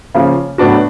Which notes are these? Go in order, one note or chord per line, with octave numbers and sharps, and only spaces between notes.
C#3 F3 A#3
A2 F#3 B3 D4 F#4